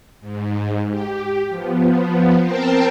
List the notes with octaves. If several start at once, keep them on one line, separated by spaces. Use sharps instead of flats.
G#2
G4
F3 B3
C4 A#4 C5 G5 A5